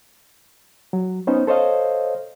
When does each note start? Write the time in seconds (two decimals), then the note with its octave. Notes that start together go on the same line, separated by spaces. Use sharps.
0.93 F#3
1.27 B3 C#4 D#4 C5
1.47 A4 C5 C#5 D#5 F5